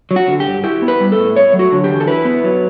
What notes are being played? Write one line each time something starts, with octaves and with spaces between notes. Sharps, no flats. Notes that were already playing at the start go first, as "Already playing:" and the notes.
F#3
F#4
D3
G4
G2
E4 G4
B3
B4
G3
A4
A2
A3 C#5
F#3
F#4
D3
G4
E2
A4
E4 B4
B3
F#3